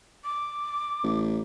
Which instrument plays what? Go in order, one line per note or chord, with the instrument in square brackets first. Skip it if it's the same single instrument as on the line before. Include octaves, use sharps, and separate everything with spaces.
[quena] D6
[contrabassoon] A1